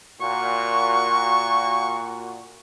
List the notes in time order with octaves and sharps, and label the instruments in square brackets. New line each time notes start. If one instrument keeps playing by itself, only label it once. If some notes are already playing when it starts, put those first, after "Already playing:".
[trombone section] A#2 F#4 [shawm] C#6